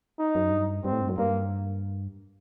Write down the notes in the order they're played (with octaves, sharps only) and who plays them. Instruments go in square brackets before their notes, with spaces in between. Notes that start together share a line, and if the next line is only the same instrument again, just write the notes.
[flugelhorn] D#4
[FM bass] F#2
G2
[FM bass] G2 [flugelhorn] C4
[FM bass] A2
G2
F#2
[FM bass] G2 [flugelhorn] A#3